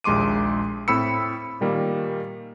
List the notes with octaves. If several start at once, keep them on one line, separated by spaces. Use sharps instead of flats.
A#1 D#2 G#3 C6 D6 D#7
A2 C4 B5 E6 C#7
A#2 D#3 G3 A#3